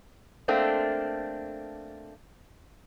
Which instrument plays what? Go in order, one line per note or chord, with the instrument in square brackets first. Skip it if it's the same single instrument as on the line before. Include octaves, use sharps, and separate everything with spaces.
[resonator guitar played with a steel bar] A3 A#3 C4 D4